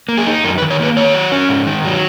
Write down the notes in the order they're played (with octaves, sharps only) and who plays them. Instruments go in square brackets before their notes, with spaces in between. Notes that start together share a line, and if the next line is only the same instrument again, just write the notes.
[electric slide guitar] A#3
G#4
D#4
F#2 A#4
B4
D#3
C#5
A#3 B4
D#3 C#5
F#3
C#4
G#2
D#3
F#3